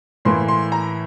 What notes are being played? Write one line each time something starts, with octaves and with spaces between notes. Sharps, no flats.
A2 E3 A#3 C6
C6
A#5